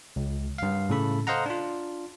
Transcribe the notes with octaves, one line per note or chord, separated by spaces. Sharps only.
C#2
G2 F5
A2 C#3 A4 B5
A4 C5 D#5 F5 F#5 A#5
D4 F4